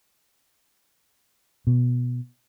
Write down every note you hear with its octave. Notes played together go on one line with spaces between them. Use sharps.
B2